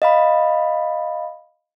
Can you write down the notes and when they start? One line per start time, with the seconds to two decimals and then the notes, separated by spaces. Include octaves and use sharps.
0.02 D#5 F5 B5